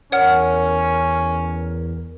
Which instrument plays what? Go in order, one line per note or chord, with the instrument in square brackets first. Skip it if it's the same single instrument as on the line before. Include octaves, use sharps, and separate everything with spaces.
[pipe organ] E2 [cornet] C#4 [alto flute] A#4 [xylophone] C#5 F#5 F6